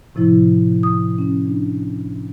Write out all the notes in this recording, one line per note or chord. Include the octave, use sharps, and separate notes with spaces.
A2 C3 F3 E4
D#6
C#4
D4